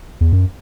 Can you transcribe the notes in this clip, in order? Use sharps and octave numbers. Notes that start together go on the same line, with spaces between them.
E2
F#2